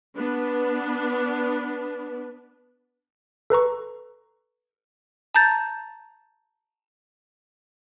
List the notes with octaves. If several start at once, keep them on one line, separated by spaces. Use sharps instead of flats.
B3 D4 B4
A4 B4 A#5 C#6
A5 A#5 G6 A6